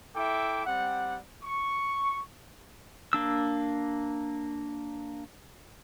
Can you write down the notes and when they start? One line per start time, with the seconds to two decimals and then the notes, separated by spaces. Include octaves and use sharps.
0.15 E4 A4 E5 G5 D6
0.66 G3 C4 D5 F#5
1.43 C#6
3.13 A#3 D4 E6